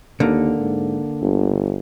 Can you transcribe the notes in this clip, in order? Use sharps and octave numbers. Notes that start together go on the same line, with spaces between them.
D#2 D3 A#3
G#2
G1